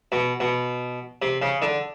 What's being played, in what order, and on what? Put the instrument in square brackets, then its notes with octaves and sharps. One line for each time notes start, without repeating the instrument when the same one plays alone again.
[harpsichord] B2
B2
C3
C#3
D3